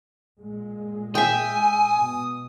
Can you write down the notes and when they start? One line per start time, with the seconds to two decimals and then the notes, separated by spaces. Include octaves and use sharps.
0.41 A#2 G#3
1.15 E5 G5 G#5 D#6
1.96 B2